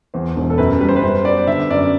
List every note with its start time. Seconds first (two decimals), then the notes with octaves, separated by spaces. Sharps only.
0.14 E2 C5
0.36 E1
0.50 A4
0.58 F#2 B4
0.80 G3 B4
0.89 C5
0.96 B4
1.02 F#2 C5
1.25 B3 D5
1.47 D3 E5
1.70 F#2 D5